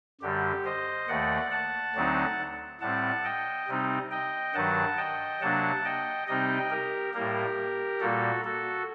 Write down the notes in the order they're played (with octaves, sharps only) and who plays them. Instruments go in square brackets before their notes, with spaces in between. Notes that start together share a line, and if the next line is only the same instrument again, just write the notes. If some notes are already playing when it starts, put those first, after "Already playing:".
[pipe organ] F#2 D3 G3 G4
C5 D#5
D#2 D#3 A3 D5 F#5
F#5 A5
D2 D3 F#3 C4 D#4
A2 G3 C4 F#5 A5
D#5 G5
C3 G3 C4 D#4
D#5 G5
G2 D#3 F#3 F#5 A5
D#5 G5
C3 F#3 A#3 D4 F#5 A5
D#5 G5
C3 G3 C4 D#4 D#5 G5
G4 A#4
A2 G3 A#3 G4 A#4
A#2 G3 A#3 F#4 A4
F#4 A4